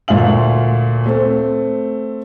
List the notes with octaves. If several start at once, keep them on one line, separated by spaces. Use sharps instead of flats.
D2 A#2 E5 F5 F#7
A3 C4